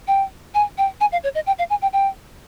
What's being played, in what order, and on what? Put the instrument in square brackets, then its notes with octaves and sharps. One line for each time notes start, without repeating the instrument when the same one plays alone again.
[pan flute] G5
G#5
G5
G#5
F5
C#5
D#5
G5
F5
G#5
G5
G5